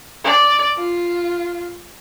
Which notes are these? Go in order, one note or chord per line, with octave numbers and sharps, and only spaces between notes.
D5
F4